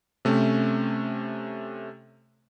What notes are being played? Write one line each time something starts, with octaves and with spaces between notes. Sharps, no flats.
C3 A3 C4 C#4